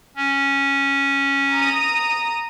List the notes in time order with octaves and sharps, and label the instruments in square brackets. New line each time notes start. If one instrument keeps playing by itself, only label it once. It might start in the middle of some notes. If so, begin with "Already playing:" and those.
[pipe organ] C#4
[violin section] A#5 D#6